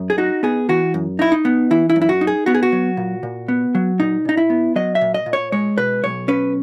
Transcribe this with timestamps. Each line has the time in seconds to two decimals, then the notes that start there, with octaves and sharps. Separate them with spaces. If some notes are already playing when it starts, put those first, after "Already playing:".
Already playing: F#2
0.10 G#4
0.18 D#4 F#4
0.43 B3 G#4
0.69 E3 F#4
0.94 F#2
1.19 D#4 E4
1.32 D#4
1.45 B3
1.71 E3 E4
1.90 E4
1.96 F#2
2.02 E4
2.09 F#4
2.21 D#4
2.27 G#4
2.46 B3 F#4
2.54 G#4
2.63 F#4
2.72 F#3
2.97 A#2
3.23 A#2
3.48 B3
3.75 F#3
4.00 A#2 D#4
4.25 A#2 D#4
4.37 E4
4.50 B3
4.76 F#3 D#5
4.95 E5
5.01 A#2
5.14 D#5
5.26 A#2
5.33 C#5
5.52 G#3 C#5
5.78 B2 B4
6.04 B1 C#5
6.28 C#4 B4